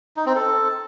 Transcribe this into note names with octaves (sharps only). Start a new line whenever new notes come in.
D#4
C4
A4